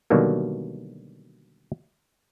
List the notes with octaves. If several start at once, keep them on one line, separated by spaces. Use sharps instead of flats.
B2 D3 D#3 F#3 G3 A#3